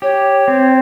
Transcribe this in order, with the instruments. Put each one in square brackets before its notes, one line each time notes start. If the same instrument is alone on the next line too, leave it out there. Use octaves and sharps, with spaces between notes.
[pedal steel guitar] G4 [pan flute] C#5
[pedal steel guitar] C4